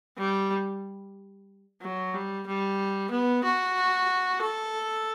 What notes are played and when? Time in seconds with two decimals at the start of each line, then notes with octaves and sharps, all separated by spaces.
0.18 G3
1.82 F#3
2.14 G3
2.47 G3
3.11 B3
3.44 F#4
4.42 A4